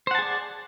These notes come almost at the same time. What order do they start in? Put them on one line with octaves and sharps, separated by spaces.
C5 F#5 A5 G#4 D5